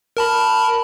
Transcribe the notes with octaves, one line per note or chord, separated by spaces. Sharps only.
A#4 A5 B5